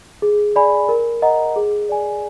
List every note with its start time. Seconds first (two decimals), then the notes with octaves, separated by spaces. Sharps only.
0.22 G#4
0.56 D5 G#5 B5
0.89 A#4
1.22 D#5 F#5 A#5
1.56 G#4
1.89 D5 G#5